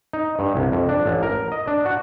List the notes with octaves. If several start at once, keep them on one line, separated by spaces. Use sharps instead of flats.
D#4
G2
C2
F2
D4
A1
A#4
D#5
D4
F#4